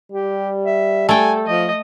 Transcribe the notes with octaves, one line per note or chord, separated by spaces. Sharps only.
G3 G4
E5
A3 A4 G5 G#5
F3 D#5